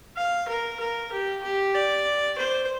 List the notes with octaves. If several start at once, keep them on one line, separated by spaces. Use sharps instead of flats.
F5
A#4
A#4
G4
G4
D5
C5